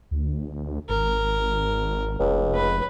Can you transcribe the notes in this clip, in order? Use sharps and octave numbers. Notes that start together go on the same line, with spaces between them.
D2
G#1 A#4
F1 C#2
B4